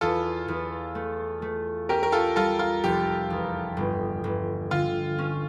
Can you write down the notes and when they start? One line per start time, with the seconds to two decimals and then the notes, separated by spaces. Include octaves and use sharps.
0.01 E2 F4 A4
0.48 E2
0.95 A3
1.42 A3
1.89 C#4 G4 A#4
2.03 A#4
2.12 F4 A4
2.36 G3 F4 A4
2.59 F4
2.84 F1 G4
3.30 E2
3.77 G1
4.24 G1
4.71 D3 F4
5.18 C#4